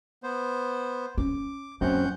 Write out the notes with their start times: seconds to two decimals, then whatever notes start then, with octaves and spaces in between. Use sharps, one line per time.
0.23 B3 C5
1.18 C#4 D6
1.81 F#2 A#3 C4 C#4 F#5 G6